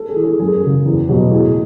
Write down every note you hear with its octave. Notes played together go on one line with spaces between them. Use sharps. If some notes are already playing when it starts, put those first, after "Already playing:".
Already playing: A4
G#4
E3
G#4
F#2 G#4
C#3 F#3
E2
B2 F#3
A2 G#4